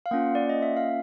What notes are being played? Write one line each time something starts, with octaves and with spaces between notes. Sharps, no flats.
F5
A#3 C#4 F4 F#5
D5
D#5
E5
F5